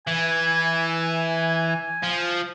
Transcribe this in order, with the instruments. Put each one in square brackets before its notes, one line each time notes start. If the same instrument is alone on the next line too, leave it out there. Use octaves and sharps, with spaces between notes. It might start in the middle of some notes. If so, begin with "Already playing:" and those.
[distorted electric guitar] E3 [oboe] G#5
[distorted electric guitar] F3